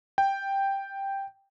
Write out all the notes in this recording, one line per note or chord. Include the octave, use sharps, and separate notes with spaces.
G5